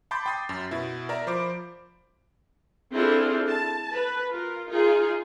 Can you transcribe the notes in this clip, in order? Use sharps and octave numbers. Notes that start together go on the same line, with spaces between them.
A5 B5 C6 D6 G6 A6
G5 D6 D#6 A6 C7
F#2
B2 E4
A#4 D5 E5 A#5
F3 C5 B5 D6 D7
C4 D4 E4 F4 G#4 A4
A5
B4
F4 A#4
D#4 F4 G#4